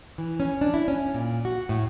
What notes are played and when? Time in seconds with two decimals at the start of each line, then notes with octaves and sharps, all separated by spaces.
0.18 E3
0.40 C#4
0.61 D4
0.74 E4
0.88 C#4
1.14 A#2
1.45 F#4
1.69 A2